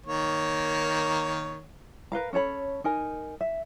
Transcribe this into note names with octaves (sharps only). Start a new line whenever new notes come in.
D#3 A#3 C#5
A#4 B4 F5 A#5
C#4 A4 C#5 B5
D#4 A#4 G#5
E5